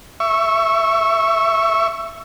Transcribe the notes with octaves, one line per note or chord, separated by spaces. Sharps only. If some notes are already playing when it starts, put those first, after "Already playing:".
E5 C#6